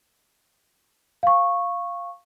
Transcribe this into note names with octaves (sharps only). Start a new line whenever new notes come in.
F5 C#6